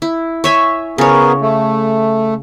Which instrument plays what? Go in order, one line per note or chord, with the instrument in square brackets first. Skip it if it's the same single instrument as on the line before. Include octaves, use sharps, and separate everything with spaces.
[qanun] E4
C#5 E5 G#5
[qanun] C#3 C#5 [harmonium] B3 G#4 A#4
[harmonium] A3